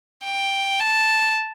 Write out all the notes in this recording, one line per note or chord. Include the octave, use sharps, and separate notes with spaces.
G5
A5